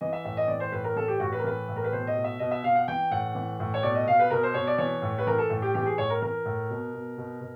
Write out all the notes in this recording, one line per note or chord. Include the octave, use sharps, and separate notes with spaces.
E3 D#5
E5
A2 E5
D#5
E3 D5
C5
A2 B4
A#4
E3 A4
G4
A2 F#4
B4
A#4
E3 B4
A2
A#4
B4
B2 C5
D#5
B2
E5
B2 D#5
E5
B2 F5
F#5
E3 G5
A2 F#5
E3
A2
C#5
B2 D5
D#5
B2 F5
B4
B2 A#4
C5
B2 C#5
D5
E3 C#5
A2
B4
E3 A#4
A4
A2
G4
E3 G4
G#4
A2 C#5
A#4
E3 A#4
A2
B2
B2
B2
B2